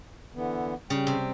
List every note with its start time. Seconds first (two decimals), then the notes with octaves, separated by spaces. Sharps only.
0.35 D3 E3 B3
0.90 C#3 G3 G5
1.07 C3